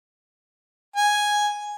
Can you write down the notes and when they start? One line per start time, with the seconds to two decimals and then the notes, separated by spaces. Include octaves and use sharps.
0.96 G#5